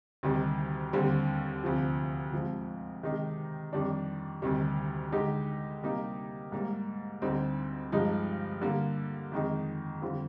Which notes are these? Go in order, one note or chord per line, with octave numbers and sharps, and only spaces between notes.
D2 C3 D#3 G3
D#2 D3 G3 C4
D2 C3 F3 C4
G#2 F3 C4
C3 D#3 G#3 D#4 G4
F2 D#3 G3 D4
D2 C3 D#3 G3
D3 G#3 D#4 G4
C3 G3 A#3 D#4 G4
G#2 G3 A#3
D2 D3 G3 C4 D#4
G2 F3 G#3 D#4
D3 G3 A#3
F2 D#3 G#3 D#4
F2 D3 G3 C4 F4